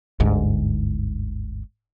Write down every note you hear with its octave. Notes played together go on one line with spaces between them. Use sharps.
G1 D2 G#2